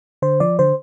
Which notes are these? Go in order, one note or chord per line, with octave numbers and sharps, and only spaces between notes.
D3 C5
F3 D5
D3 C5